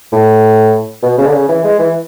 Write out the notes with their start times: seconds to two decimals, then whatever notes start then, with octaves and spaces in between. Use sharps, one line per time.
0.12 A2
1.03 B2
1.18 C#3
1.26 D3
1.33 C#3
1.49 E3
1.64 G#3
1.79 E3